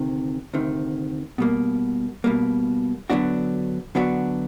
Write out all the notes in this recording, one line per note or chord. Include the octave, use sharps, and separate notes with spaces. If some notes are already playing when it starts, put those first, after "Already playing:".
Already playing: D2 C3 D#3
D2 C3 D#3
B2 G3 A#3
B2 G3 A#3
D3 F#3 B3 D4 F#4
D3 F#3 B3 D4 F#4